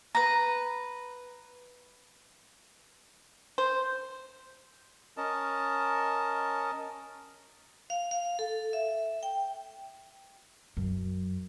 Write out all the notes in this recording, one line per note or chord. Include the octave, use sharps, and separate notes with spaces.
B4 A#5
C5
C#4 A#4 D#5 A5
F5
F5
A4
E5
G5
F#2